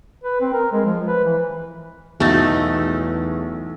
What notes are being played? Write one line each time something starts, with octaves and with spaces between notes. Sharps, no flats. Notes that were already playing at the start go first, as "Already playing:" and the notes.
B4
C4
A#4
G#3
F3
B4
E3
B1 E2 A3 D#4 F#4 A6